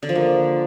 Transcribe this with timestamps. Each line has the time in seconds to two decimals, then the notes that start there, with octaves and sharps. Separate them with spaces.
0.03 D3
0.09 F3
0.16 A#3